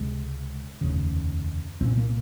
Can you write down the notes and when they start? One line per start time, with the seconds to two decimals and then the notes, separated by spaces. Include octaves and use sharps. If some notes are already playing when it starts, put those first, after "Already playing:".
Already playing: C#2 C3 G#3
0.81 F1 D#2 C#3
1.81 C2 A#2 C4
1.97 A#3